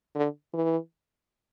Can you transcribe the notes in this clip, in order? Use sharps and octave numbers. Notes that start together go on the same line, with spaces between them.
D3
E3